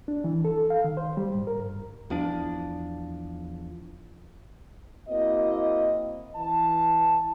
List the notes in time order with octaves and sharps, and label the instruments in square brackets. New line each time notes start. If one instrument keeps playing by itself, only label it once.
[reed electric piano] D4
E3
A4
F5
D#3
C5
G3
G#2
A#4
G2
[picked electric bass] E2 F3 D4
[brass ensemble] A#3 C4 E4 F#4 D#5
E3 A5